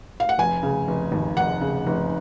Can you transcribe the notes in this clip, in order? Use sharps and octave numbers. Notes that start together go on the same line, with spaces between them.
F5
F#5
F1 G#5
C#3
F1
D#2
F1 F#5
C#3
F1